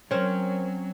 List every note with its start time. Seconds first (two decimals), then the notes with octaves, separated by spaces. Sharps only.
0.11 F#3 C4 C#4 A#4 C5 C#5